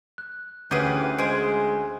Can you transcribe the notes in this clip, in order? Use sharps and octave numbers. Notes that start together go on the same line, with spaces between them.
F#6
D2 E3 C#4 G4 G#4 B4 F#5 G6
G#3 G#4 C5 G#5 D7